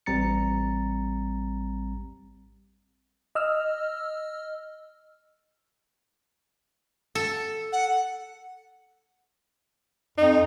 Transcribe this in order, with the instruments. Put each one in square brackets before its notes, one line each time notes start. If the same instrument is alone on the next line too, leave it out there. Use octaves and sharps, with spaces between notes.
[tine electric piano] A1 G3 C4 A#5 A6 C#7
[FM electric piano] D#5 E6 F6
[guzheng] A4
[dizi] F#5
[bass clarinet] F2 [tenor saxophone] D#4